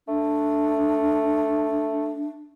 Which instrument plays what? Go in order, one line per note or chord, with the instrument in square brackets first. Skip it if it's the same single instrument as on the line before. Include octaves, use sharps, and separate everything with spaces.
[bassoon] A3 [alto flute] D4